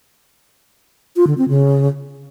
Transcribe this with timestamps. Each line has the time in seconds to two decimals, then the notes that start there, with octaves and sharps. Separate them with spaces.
1.16 F4
1.27 D3
1.38 C4
1.49 C#3